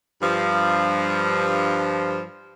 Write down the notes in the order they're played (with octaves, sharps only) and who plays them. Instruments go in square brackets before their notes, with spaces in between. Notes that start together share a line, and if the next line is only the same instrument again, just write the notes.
[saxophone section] G2 F3